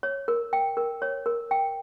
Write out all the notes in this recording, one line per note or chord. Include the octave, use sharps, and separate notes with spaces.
C#5
A#4
G5
A#4
C#5
A#4
G5